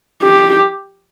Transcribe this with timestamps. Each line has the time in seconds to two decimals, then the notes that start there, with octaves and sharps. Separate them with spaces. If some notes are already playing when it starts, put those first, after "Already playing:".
0.23 G4